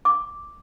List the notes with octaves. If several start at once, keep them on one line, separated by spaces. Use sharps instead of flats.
D6